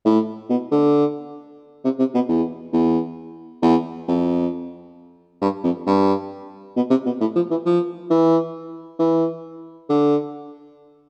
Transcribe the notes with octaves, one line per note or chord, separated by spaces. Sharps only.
A2
B2
D3
C3
C3
B2
E2
E2
E2
F2
G2
F2
G2
B2
C3
B2
A2
F3
E3
F3
E3
E3
D3